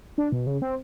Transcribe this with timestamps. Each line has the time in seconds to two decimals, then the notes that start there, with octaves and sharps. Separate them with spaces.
0.18 D4
0.32 B2
0.47 C#3
0.62 C4